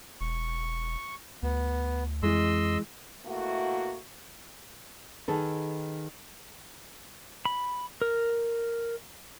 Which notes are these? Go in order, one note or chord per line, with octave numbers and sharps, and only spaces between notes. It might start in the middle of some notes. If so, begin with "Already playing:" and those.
E1 C#6
D2 B3
F2 E3 G#3 D#5 C6 E6
B2 A3 A#3 E4 F#4
D#3 G#4 A4 B4
B5
A#4